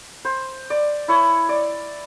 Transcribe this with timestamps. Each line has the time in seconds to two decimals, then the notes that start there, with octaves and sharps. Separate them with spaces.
0.25 C5
0.70 D5
1.08 E4 C#5
1.49 D5